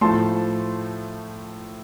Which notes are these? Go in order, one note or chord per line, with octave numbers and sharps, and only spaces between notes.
A2 F3 A3 A5 C6